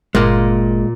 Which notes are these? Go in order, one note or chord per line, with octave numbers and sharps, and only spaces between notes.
G1 A#2 G#3 A#3